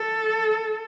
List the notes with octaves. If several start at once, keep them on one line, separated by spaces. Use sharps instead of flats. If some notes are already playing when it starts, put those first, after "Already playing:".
Already playing: A4